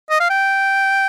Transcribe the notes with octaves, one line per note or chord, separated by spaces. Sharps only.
D#5
F5
G5